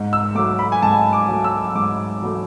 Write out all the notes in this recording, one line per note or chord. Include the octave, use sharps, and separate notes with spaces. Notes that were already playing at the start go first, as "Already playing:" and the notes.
Already playing: G#2
E6
F#3 A3 D6
B5
G#5
G#2 A5
D6
F#3 A3
E6
G#2 D6
F#3 A3